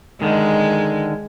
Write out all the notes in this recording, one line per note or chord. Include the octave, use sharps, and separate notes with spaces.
D3 D#3 G#3